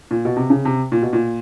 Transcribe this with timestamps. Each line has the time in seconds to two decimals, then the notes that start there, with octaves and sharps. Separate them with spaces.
0.11 A#2
0.25 B2
0.37 C3
0.50 C#3
0.65 C3
0.92 A#2
1.02 B2
1.13 A#2